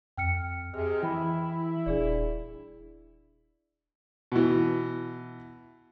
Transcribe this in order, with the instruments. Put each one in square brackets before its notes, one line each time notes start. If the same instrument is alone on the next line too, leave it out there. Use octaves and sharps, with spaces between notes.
[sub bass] F2 [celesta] G5 F6 C#7
[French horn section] C3 G#4 D#5 [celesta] F6
[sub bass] E3 [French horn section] E4 [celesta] G5 B5
[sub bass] D#1 [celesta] D4 G#4 D5
[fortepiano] B2 E3